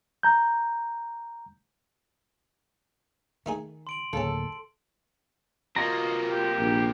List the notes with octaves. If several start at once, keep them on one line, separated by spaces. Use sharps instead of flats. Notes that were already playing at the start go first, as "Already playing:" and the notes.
A#5 G6
D#3 A3 D#4 G#4
C6 D7 F#7
D1 C#3 A#3 C#4 A4
C3 A#3 F4 F#4 D#5 A#5
G4
A#1